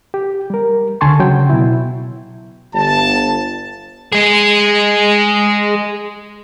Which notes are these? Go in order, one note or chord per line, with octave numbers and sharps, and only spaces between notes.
G4
G3 A#4
C#2 D3 G#5 A5 C6 C#6
C#3 F#3 G5
B2 E4
G1 A5
G#3 G#4